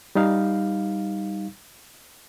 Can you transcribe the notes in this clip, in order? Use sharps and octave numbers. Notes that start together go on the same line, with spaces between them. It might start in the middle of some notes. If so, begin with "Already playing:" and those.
G3 D#4 F5